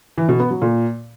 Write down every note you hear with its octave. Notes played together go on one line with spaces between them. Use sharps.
E3
B2
B3
F#3
A#2